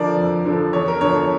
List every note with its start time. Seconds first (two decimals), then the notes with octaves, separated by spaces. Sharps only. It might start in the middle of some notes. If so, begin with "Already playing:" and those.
Already playing: D3 F3 A#4 D5
0.17 F2
0.45 D3 F3
0.73 E2 C#5
0.88 A#4
1.01 D3 F3 C#5
1.16 C#5